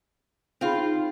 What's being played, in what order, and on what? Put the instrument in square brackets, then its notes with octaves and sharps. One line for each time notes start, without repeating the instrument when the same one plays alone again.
[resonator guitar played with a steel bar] C4 F4 [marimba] D#4 G#4 B5